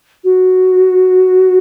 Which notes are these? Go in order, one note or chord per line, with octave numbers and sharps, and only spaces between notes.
F#4